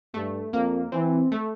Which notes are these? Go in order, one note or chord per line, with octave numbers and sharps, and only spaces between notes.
G2 A3
F2 A#3
E3 C4
A3